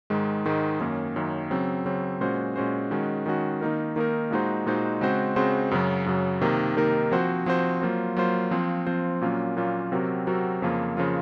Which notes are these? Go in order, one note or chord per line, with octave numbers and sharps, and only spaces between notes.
G#2 D#3 G#3
G#2 D#3 G#3
F#2 D#3 A#3 C#4
F#2 D#3 A#3 C#4
C#3 F#3 C4
C#3 F#3 C4
A#2 G#3 C#4 F#4 C5
A#2 G#3 C#4 F#4 C5
D#3 G#3 C#4 F#4
D#3 G#3 C#4 F#4
D#3 A#3 D#4 A#4
D#3 A#3 D#4 A#4
A#2 G#3 D#4 F#4 C5
A#2 G#3 D#4 F#4 C5
C#3 G#3 C4 F#4 C5
C#3 G#3 C4 F#4 C5
F#2 C#3 F#3
F#2 C#3 F#3
C3 D#3 A#3 D#4 A#4
C3 D#3 A#3 D#4 A#4
F3 C4 F#4 C5
F3 C4 F#4 C5
F#3 A#3 F4 C5
F#3 A#3 F4 C5
F3 C4 F4 C5
F3 C4 F4 C5
A#2 F#3 A#3 C#4 F4
A#2 F#3 A#3 C#4 F4
C3 F#3 C4 F#4 A#4
C3 F#3 C4 F#4 A#4
F2 C#3 F3 A#3 F4
C#3 F3 A#3 F4